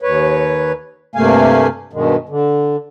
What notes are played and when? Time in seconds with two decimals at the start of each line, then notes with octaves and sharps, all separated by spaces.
0.02 D#2 B4 C#5
1.15 G2 C3 A3 A#3 F5 G#5
1.93 G2 B2 D#3 G#3
2.29 D3